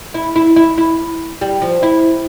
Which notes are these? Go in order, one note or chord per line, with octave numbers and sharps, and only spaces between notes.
E4
E4
E4
E4
G3
F3
E4